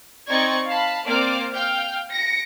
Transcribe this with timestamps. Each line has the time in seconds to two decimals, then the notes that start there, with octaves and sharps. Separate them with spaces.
0.28 C4 D#4 D5 C#6 G#6
0.67 F5 A5 B5
1.07 A#3 C4 C5 D5 D6 F6
1.51 F5 G5 F6
2.10 A#6 C#7 D7